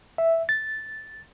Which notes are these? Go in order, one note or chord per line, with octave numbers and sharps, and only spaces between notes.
E5
A6